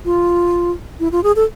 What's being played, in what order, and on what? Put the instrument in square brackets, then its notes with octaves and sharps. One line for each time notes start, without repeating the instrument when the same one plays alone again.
[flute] F4
E4
F4
G#4
A4